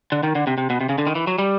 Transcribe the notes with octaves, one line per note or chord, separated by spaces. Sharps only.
D3
D#3
D3
C3
C3
B2
C3
C#3
D3
D#3
E3
F#3
G3